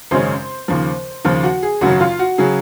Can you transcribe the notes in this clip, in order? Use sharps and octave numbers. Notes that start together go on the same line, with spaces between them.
G#1 F#2 C#3 G#3 C#4 C5
D#2 C#3 F3
D#2 C#3 F3 F4
F#4
G#4
G#1 F#2 C#3 F#3 F#4
F4
F#4
C#3 F#3 G#4